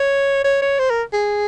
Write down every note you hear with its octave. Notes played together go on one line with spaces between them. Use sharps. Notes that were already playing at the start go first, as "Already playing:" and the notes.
Already playing: C#5
C#5
C#5
C5
A#4
G#4